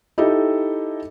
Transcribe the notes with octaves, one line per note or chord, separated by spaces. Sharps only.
D#4 E4 G4 A4 D#5